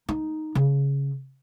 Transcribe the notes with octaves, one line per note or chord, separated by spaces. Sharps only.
D#4
C#3